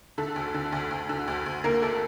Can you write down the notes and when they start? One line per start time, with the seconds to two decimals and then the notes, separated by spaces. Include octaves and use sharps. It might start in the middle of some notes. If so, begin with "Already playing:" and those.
0.18 D3 A3 A4
0.36 D2
0.54 D3
0.72 D2
0.91 D2
1.09 D3
1.28 D2
1.46 D2
1.64 D3 A#3 A#4
1.82 D2 A3 A4